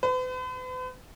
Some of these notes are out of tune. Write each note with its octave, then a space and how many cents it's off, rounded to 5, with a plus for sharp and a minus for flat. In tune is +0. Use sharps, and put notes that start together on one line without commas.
B4 +45